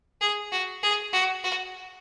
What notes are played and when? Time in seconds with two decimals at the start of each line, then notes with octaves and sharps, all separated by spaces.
0.21 G#4
0.51 F#4
0.83 G#4
1.13 F#4
1.44 F#4